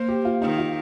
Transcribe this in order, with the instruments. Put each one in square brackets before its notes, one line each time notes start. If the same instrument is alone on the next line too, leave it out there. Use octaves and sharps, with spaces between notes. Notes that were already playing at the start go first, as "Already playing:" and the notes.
Already playing: [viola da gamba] A#3 [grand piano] C5
[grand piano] G4
F4
[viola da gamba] D#3 [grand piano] D#4
[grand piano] F4